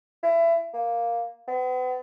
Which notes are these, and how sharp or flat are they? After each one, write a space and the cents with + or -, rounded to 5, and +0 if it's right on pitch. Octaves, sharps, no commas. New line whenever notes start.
E4 +25
A#3 +5
B3 +40